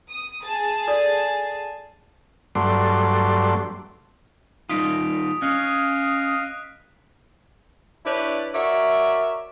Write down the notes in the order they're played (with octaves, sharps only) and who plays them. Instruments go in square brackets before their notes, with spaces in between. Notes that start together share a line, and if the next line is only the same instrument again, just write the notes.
[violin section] D#6
G#4 G#5 A5
[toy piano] A4 D5
[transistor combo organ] G2 F#3 A3 D5 C6
[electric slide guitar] G3 D#4 F4 [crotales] D#6 B6 D7
[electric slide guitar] C#4 [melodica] D#5 F5 [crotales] F#6
[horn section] D4 E4 G4 B4 C#5 D5
F#4 A#4 C#5 D5 E5